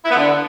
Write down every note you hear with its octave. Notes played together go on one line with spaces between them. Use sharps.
E4
B3
D3